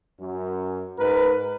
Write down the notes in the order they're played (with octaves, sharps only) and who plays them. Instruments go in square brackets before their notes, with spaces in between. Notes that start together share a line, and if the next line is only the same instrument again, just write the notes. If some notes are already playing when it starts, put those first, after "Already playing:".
[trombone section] F#2
G#2 A#4 B4